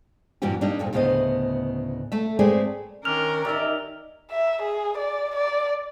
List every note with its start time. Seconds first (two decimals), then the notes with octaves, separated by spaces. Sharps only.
0.42 G2 A#2 E3 G3 F#4 G4
0.61 G3 A#3 D4 D#4
0.79 F2 A#2 A4
0.93 D2 A2 C#3 B3 C5 D#5
2.12 A3 E5
2.39 G#3 A3 C4 G#4 B4 D5
3.05 D#3 C#4 D4 A#4 F6 F7
3.45 D#3 E3 D#4 G4 D5 E5
4.31 E5
4.62 G#4
4.98 D5
5.35 D5